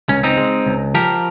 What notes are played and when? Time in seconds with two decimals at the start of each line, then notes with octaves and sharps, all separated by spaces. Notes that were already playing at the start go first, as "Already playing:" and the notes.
0.09 C#2 C#4
0.23 C4 D#4
0.37 G#3
0.66 C#2
0.94 F3 G4 A#4